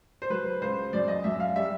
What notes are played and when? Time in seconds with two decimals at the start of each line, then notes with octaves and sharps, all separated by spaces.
0.22 C5
0.30 F#3 B4
0.61 C#2 C5
0.93 F#2 D5
1.08 D#5
1.24 F#2 E5
1.40 F5
1.56 G3 E5